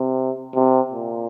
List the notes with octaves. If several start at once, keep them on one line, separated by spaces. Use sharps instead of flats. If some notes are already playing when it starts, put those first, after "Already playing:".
Already playing: C3
C3
A#2